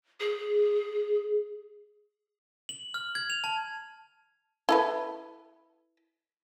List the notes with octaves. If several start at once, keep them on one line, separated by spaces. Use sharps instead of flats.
G#4
F#7
F6
G#6
F7
A5
E4 A4 B4